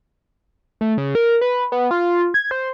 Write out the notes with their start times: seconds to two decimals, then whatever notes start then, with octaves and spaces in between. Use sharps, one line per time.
0.81 A3
0.98 C#3
1.15 A#4
1.41 B4
1.72 B3
1.91 F4
2.34 G#6
2.51 C5